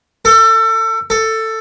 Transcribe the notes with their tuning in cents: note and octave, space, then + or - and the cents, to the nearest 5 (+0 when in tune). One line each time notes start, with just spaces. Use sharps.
A4 +30
A4 +15